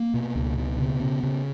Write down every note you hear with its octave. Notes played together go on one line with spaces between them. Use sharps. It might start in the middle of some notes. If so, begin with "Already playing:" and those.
Already playing: A#3
B2
C#2
B2
C#3 B3
C#3
C#3